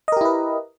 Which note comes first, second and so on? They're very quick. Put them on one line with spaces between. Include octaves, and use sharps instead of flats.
D#5 A#4 G4 E4 B4